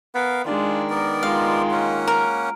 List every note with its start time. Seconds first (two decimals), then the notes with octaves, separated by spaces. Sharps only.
0.15 B3 A#4 F5
0.45 D#3 G#3 D4 F4
0.90 B3 A#4 D5
1.23 G#3 F4 F5
1.71 A#3 C#4 F#5
2.07 A#4